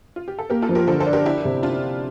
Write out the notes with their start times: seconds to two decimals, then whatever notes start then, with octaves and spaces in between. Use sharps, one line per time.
0.16 F4
0.28 G4
0.39 A4
0.50 A#3 G4 A#4
0.62 F4 A4
0.69 F3
0.75 G4 A#4
0.87 D3 A4 C5
1.00 A4 C5
1.06 D4
1.13 G4 A#4
1.25 D4 E4 G4
1.45 C3
1.63 D4 F4